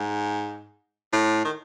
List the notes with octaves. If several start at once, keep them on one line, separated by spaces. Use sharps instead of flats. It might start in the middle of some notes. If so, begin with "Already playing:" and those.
Already playing: G#2
A2
D#3